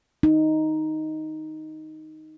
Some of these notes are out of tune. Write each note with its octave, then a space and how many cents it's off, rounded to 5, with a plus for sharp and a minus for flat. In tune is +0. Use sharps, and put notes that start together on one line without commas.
D#4 +0